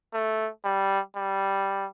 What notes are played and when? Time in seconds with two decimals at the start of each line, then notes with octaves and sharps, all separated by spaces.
0.13 A3
0.64 G3
1.16 G3